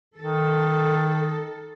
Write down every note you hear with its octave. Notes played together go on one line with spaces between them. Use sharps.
D#3 A4